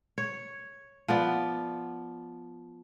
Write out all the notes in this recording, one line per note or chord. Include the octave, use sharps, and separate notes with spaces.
C#5
F3 B3 D5